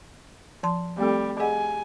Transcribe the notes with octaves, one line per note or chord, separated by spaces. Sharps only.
F3 A5 C6
G3 A3 C4 A4
G#4 D#5 F#5 G#5